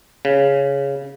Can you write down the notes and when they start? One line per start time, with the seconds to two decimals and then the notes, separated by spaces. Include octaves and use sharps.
0.25 C#3